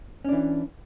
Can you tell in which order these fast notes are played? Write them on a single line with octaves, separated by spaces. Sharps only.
C#4 D4 E3